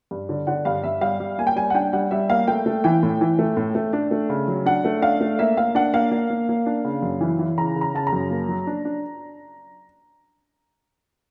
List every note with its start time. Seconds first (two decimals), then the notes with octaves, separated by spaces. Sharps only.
0.11 G2
0.29 D3
0.47 D3 F#5
0.65 G2 F5
0.84 G2 E5
1.01 G3 F5
1.20 G3
1.38 A#3 G#5
1.47 G5
1.56 G3 G#5
1.70 F#5
1.75 D4 G5
1.93 G3 F#5
2.11 G3 E5
2.30 A#3 F5
2.47 A3 G5
2.66 A3
2.84 E3 G5
3.03 A2
3.21 E3
3.39 A3
3.57 A2
3.75 A3
3.93 D4
4.11 A3
4.29 C#3
4.48 F#3
4.66 D4 F#5
4.85 A3
5.02 D4 F5
5.21 A3
5.39 A#3 E5
5.57 A#3 F5
5.75 D4 F#5
5.94 A#3 F5
6.11 A#3
6.30 A#3
6.49 A#3
6.66 D4
6.85 C#3
7.02 F#2
7.21 E3
7.39 E3
7.58 C#3 A#5
7.76 C#3
7.81 A#5
7.94 C#3 A5
8.07 A#5
8.13 F#2
8.31 A#3
8.49 F#3
8.67 D4
8.85 D4